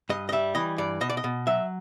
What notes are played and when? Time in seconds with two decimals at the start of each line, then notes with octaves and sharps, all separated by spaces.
0.09 G2 D#5
0.29 D#5
0.32 G3 E5
0.55 E3 D#5
0.78 G2 D5
1.01 B2 D#5
1.10 D5
1.17 D#5
1.24 B2
1.47 F#3 E5